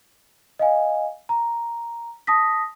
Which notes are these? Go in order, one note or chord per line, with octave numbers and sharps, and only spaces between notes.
D#5 F5 G#5
A#5
A5 D#6 A#6 B6